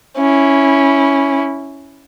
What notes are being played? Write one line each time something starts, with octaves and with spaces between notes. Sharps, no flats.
C#4 E4